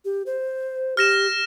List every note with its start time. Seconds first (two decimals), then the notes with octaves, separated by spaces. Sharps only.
0.05 G4
0.26 C5
0.97 G4 F6 A#6 E7